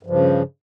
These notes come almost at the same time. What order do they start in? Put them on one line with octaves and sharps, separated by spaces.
G2 F3 C#3